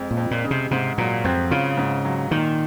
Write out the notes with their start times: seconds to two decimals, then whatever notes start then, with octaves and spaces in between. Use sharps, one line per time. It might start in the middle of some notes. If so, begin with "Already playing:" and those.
Already playing: F2 G#3
0.11 A#2
0.17 F2
0.31 A#2
0.44 C#3
0.51 C3
0.71 G#2 C3
0.98 A#2 F#3
1.24 F2 C4
1.51 C#3 F4
1.78 G#2
2.05 F#3
2.31 A#2 D#3